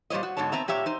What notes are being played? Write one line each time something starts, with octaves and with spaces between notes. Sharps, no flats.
A#2 G3 C#4 C5 C#5 D#5
F#4
G#2 B2 D3 C#5 A5
B3 C4 E5 A#5
A#2 G4 C#5 E5 A#5
D#4 C5